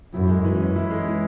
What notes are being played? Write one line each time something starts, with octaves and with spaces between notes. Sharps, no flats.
F#2 E4
G#3
E3
C#4
E4
G#3
E3